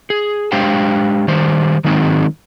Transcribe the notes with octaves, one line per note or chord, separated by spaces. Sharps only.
G#4
G#3 D4 G4 C5 F5 G5
D#3 G3 C5
D#3 F#3 G#3 C4 D#4